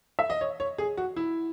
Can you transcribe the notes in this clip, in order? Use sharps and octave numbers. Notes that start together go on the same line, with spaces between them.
E5
D#5
C#5
C#5
G#4
F#4
E4